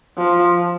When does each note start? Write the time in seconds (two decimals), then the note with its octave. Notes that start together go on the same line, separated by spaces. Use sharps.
0.17 F3